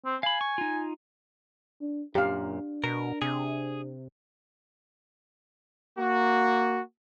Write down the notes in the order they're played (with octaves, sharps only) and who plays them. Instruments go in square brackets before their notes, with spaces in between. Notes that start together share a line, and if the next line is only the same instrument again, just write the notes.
[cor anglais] C4
[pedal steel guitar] F5 B5 [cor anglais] G#5
[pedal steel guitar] C#6
D#4 F4
[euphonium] D4
[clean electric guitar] F#2 A#2 [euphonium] D4 [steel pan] G4 F5
[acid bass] B2 [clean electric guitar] A#4
[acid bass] C3 [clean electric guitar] G#4
[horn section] A#3 F#4